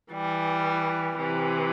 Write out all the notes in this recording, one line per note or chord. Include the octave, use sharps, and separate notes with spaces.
E3 G3
C3 E3